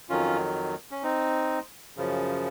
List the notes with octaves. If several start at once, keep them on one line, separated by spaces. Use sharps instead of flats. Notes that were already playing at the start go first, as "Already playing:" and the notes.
F2 D#3 F#3 C#4 F4
C#4
C4 D#4
F#2 C#3 F3